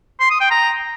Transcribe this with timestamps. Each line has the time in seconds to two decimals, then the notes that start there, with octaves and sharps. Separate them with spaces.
0.20 C6
0.30 D#6
0.41 G5
0.51 A#5